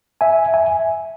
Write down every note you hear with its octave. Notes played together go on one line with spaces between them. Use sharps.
E5 G#5
E5 G#5